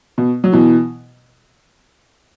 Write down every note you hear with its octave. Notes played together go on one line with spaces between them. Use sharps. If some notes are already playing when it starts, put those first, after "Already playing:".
B2
F#3
B2 E3